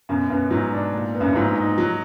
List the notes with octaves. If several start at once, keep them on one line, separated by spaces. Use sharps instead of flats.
F#2 B2
F#2 B3
G#2 F#3
D4
A#2
B3
F#2
G2
G#2 F#3
D#4
F#3